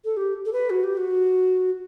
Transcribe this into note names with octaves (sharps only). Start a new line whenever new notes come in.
A4
G4
A4
B4
F#4
G4
F#4